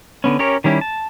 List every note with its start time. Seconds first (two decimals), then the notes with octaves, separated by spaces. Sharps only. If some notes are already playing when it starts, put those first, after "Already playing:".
0.24 D3 B3 C#4
0.39 C#4 G4 A#4 C#5
0.64 D#3 G3 C#4 E4 G4
0.81 A5